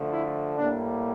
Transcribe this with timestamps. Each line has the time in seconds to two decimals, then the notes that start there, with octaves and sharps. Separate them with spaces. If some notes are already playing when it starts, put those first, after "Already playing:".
Already playing: D3 F3 A3
0.12 E4
0.57 A2 G3 A#3 D4